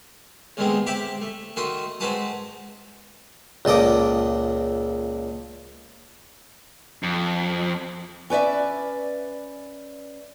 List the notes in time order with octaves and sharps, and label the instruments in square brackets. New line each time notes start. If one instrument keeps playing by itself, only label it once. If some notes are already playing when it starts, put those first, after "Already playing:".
[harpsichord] D#2 G#2 D3 G#3 B3 C4
C3 G4 E5 G5 B5 D6
A3
D#3 A3 F#4 C6 D#6
G#2 C4 F#4 B4 A5 D#6
C#2 A#2 A4 D#5 D6
[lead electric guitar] F2
[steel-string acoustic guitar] C#4 B4 D5 E5